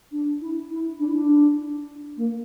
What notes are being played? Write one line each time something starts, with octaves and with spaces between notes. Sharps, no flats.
D4
E4
E4
D4
E4
D4
A#3